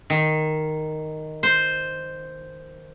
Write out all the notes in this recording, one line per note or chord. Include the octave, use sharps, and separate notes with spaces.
D#3
C5